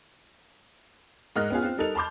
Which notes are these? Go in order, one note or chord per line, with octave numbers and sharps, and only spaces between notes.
G#2 A#4 D#5 F6 F#6
B3 C#4 F4 G#4
C4 F4
G3 D#4 A4 A#4 F7
A5 B5 C6 D6 G6